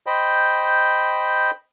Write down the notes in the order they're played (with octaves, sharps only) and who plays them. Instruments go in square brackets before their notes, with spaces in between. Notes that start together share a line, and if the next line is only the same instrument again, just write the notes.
[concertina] C5 D#5 G5 B5